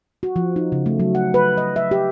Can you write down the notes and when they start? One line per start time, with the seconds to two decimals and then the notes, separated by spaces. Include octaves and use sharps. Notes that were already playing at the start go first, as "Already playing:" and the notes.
0.23 F#4
0.36 F3
0.56 D#4
0.72 C#3
0.86 A3
1.00 F#3
1.15 F#5
1.34 B4
1.57 D#5
1.76 E5
1.91 G4